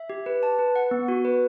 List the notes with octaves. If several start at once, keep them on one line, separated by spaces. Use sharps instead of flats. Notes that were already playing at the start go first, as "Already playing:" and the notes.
Already playing: E5
G4
B4
A5
B4
F#5
B3
F#4
B4